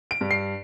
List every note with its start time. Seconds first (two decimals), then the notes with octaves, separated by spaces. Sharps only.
0.11 D7
0.21 G2
0.31 C7